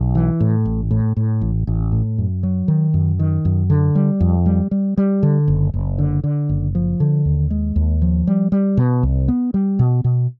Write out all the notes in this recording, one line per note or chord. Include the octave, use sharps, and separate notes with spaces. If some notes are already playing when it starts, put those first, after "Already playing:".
Already playing: B1
E3
A2
A1
A2
A2
A1
A1
A2
F#2
F#3
D#3
F#2
D#3
F#2
D3
G3
F2
G3
G3
G3
D3
F#1
F#1
D3
D3
F#1
F3
D3
D#2
G#3
D#2
F3
G3
G3
B2
C2
B3
G3
B2
B2